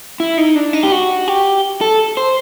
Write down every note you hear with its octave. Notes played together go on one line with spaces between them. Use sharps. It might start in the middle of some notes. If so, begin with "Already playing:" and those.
E4
D#4
D4
D#4
G4
F#4
G4
A4
C5